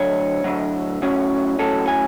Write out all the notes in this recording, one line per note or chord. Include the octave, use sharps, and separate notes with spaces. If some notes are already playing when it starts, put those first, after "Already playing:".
Already playing: D2 D3 F#3 C#5
D2 D3 F#3
A2 F#3 C#4
A2 F#3 C#4 A4
G#5